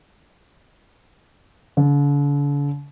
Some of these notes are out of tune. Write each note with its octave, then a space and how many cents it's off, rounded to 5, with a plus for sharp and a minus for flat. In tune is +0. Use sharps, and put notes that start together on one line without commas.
D3 -45